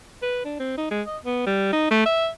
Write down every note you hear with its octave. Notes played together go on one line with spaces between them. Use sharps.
B4
D4
C4
D#4
G#3
D#5
B3
G3
D#4
A3
E5